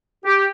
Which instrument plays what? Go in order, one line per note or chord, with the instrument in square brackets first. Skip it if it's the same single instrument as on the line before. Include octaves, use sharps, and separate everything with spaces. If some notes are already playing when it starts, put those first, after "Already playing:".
[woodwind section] G4